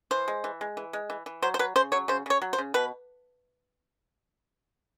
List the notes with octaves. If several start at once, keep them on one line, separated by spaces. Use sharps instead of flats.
E3 C5
G#3
E3
G#3
E3
G#3
E3
E3
F#3 C5
C5
F#3 B4
C#3 C5
F#3 C#5
C#3 C5
C#3 C#5
F#3
C5
C#3
B2 B4